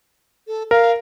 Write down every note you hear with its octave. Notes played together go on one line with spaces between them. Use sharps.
A4
A#4 F5